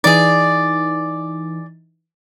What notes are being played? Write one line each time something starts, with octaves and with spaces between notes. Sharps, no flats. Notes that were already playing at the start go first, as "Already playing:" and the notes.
E3 D#4 G#4 D5